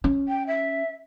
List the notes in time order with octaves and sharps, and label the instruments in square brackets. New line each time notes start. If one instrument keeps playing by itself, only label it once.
[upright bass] C#4
[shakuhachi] G5
E5